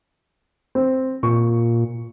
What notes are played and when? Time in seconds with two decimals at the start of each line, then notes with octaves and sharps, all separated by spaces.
0.75 C4
1.23 A#2 C#6